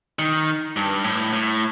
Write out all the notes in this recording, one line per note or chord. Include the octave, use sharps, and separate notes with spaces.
D#3
G2
A2
A2